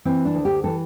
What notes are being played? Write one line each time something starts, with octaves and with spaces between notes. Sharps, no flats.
E3 C4
D4
D2
G4
E3 A4